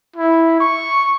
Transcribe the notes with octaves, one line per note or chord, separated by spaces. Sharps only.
E4
C#6